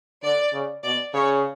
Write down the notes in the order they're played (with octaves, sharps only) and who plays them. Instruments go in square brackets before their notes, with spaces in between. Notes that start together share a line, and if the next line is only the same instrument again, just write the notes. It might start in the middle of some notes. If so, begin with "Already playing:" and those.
[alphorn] D3 [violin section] D5
[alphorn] C#3
[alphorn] B2 [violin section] D5
[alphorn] C#3 [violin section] C#5